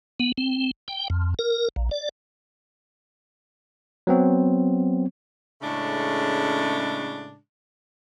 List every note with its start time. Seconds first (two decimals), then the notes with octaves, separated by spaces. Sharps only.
0.20 B3
0.38 C4
0.88 G5
1.10 F2
1.39 A#4
1.76 A#1
1.91 D5
4.07 F#3 B3 C4
5.62 A2 C#3 G#3 A3 C#4 D4